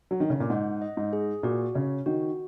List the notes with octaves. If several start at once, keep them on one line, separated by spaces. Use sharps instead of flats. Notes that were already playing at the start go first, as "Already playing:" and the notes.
F#3
D#3
C#3
A#2
G#2 F#5
D#5
G#2
G#4
A#2 F#4
C#3 C#5
D#3 F#4